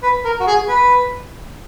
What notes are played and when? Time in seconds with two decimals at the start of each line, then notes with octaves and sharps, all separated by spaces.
0.03 B4
0.25 A#4
0.40 F#4
0.47 G#4
0.68 B4